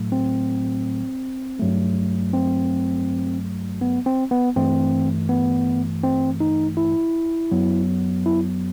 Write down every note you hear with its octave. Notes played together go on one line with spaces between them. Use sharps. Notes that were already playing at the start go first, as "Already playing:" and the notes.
Already playing: A2 F#3 A3
C4
G2 F#3 A3
C4
B3
C4
B3
G2 E3 A3 C4
B3
C4
D#4
E4
F#2 F#3 B3
E4